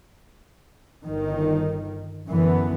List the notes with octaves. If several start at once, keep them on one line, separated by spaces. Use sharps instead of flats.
G1 D#3
F#2 D3 E3 B3